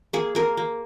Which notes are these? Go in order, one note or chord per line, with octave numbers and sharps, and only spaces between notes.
A#3 G#4
A#3 A#4
A#3